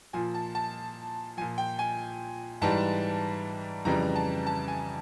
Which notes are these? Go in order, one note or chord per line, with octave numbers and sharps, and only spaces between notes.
A#2 F3 G#5
A5
A5
A#2 F3 G#5
G5
G#5
G#2 E3 G3 A5
F2 C#3 E3 G3 A#5
A5
A5
G#5